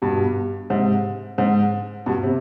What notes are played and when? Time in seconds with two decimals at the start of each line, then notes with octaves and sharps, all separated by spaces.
0.02 G2 B2
0.70 G#2 C3
1.38 G#2
2.06 G2 B2
2.23 C3